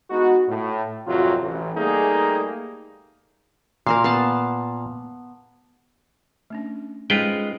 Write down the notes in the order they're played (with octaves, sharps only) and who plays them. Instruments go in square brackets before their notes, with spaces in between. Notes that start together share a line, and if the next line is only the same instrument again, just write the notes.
[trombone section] G#3 B3 D#4 F#4
A2
G#1 F2 C3 F#3 F4 F#4
A1
G3 A3 A#3 D#4 G#4
[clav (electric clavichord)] A#2 [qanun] A#4 C5 F5
[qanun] B3 F5 A5
[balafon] A3 C#4 D4
[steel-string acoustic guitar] G#3 [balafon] C#4 D#4 C5 [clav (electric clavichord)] F4 B4 G5